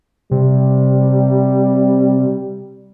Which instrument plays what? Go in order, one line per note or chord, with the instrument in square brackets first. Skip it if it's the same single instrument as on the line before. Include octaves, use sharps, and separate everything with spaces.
[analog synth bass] C3 [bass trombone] G3